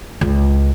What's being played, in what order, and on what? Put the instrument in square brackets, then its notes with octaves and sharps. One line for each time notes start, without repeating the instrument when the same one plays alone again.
[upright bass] C#2